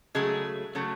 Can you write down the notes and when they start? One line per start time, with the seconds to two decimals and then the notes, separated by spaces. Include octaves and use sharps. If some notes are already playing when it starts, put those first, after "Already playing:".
0.15 C#3 F#3 G#3 A3 G#4
0.75 C#3 F#3 A3